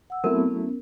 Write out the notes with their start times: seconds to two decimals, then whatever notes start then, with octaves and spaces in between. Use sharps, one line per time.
0.10 F#5 E6
0.24 F#3 A3 B3 C4 E4 A#4
0.47 B3 C#4